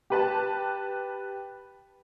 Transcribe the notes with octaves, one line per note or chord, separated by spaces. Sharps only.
G4 B4 A5